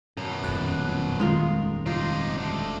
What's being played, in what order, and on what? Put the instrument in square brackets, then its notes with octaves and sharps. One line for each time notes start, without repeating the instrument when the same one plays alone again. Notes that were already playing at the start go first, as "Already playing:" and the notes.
[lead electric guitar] F#2 B2 [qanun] A#5
[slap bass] D#1 F2 [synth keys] F#6
[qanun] D#3 F4 A#4 [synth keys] G#3
[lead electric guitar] C3 D#4 [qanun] F4
[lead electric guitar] D2 D3